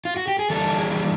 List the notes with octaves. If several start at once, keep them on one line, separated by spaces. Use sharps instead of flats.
F4
F#4
G4
G#4
E3 G3 A#3 D4 A4
G#4